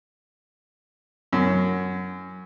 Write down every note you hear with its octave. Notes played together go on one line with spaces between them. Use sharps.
F#2